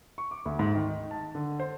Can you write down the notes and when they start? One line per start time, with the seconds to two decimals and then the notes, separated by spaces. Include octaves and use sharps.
0.18 C#6
0.31 D6
0.45 D2
0.59 G#2
0.75 D#3
0.87 D#4
1.11 A5
1.35 D3
1.60 C5